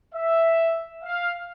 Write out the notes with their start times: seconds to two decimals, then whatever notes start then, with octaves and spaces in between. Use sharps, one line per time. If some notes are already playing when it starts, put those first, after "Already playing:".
0.14 E5
1.03 F5